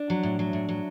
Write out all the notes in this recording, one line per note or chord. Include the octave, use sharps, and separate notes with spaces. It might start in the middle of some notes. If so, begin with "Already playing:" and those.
Already playing: D4
F#3
A2
F#3
A2
F#3